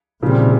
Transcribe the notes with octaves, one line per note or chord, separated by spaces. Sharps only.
A#2 C#3 F3 G3 C4
C3 D#3